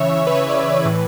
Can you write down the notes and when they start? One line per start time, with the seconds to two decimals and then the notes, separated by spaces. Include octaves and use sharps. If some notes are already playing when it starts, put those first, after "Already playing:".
Already playing: C#3 E3 C#5 E5
0.27 B4
0.32 C#5
0.49 D5
0.85 A2 E3 B4